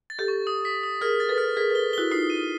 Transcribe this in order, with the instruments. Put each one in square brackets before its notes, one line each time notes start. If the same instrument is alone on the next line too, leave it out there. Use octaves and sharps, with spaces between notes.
[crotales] A6
[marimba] G4 A4
[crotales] C#6
D#6
B6
D#6
[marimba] G#4 A#4 [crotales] F6
[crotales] A6
[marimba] A4 B4
[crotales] F6
[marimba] G#4 A#4 [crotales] B6
[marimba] A4 B4
[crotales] G7
[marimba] E4 F#4 [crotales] G7
[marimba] D#4 F4 [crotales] C7
[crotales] D#7